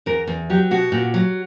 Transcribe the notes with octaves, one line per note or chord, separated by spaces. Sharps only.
E2 A#4
E2
F#3 G4
B2 F#4
A#2
F#3